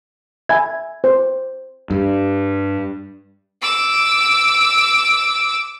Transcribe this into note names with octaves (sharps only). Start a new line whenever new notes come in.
E5 G#5 B5 G#6
C5
G2
D6 E6